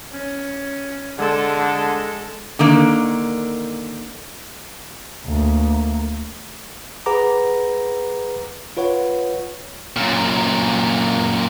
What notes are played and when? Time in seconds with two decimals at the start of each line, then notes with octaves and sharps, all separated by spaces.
0.12 C#4
1.18 D3 G#3 A4
2.59 D3 D#3 A#3
5.26 D2 A#3
7.06 G#4 B4 F#5 A#5 D6
8.77 F4 B4 C#5 F#5
9.96 F#2 A#2